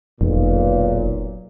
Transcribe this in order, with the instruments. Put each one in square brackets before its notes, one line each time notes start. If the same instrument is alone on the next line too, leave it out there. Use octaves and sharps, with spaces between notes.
[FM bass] F1 [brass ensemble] B1 A#2